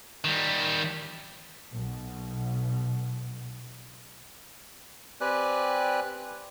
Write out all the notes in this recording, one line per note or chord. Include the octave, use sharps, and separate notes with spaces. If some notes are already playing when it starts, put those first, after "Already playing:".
D#3 G3
B1 B2
C4 G4 B4 D5 G#5 F#6